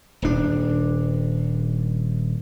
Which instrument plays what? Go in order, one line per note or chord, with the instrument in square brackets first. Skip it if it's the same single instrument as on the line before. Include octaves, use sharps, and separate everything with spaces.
[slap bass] D#1 D4